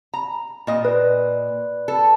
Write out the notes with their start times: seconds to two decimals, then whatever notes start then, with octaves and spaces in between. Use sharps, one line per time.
0.14 A#5
0.67 A#2 D#5
0.85 B4 D5
1.88 A4